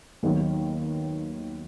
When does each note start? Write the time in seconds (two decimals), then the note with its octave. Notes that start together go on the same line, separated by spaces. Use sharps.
0.23 D#2 D#3 F#3 B3